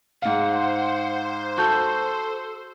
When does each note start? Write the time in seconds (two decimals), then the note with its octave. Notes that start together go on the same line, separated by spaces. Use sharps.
0.22 G#2 C5 F5 F#5
1.57 F#4 A4 A5 G6